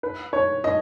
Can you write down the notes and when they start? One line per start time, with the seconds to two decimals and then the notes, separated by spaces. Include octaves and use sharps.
0.03 B4
0.33 C#5
0.64 D#5